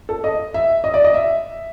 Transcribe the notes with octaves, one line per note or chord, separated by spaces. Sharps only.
A4
D#5
E5
D#5
D5
D#5
E5